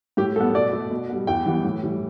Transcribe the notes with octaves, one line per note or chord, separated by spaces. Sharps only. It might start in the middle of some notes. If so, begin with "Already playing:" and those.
A2 G4
G3 B3 A4
B2 D5
A3
B2
G3 B3
E2 G5
E3 G3 B3
A2
E3 G3